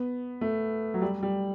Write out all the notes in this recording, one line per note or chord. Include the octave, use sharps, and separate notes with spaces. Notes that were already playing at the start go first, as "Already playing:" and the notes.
Already playing: B3
A3
F#3
G3
G3